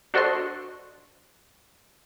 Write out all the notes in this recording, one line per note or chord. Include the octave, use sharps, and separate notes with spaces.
D4 F#4 A4 C5 D#5 C6